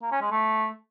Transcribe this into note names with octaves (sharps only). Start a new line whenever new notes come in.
A#3
C#4
G#3
A3